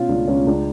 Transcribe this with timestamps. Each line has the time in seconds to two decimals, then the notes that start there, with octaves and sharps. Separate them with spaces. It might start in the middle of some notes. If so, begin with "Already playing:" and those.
Already playing: B2 C#4 F4
0.08 C#2 D4
0.27 C#2 C#4
0.46 C#2 D4